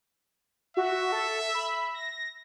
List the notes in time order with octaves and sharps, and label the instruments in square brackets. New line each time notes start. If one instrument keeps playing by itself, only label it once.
[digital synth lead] F#4 [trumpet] E5
[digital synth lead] A4
B5
A#6